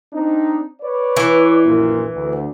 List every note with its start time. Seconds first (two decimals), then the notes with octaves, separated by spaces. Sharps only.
0.13 C4 D4 D#4
0.81 B4 C#5 D5
1.17 E3
1.65 A#1 F#2 A#2
2.15 D2